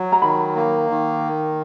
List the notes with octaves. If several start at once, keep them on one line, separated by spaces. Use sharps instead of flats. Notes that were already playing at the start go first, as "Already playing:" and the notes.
Already playing: F#3
A#5
D#3 B5
A#3
D#3